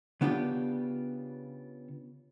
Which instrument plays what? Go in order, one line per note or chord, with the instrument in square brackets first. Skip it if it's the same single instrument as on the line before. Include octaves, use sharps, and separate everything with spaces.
[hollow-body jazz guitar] C#3 B3 D4 F4 G4